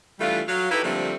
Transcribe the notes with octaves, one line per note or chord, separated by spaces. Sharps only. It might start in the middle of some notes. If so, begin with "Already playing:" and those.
E3 G3 A3 D4 F4
F#3 F5
D#4 E4 G4 A4 B4
D3 F3 G3 A3 A#3 C4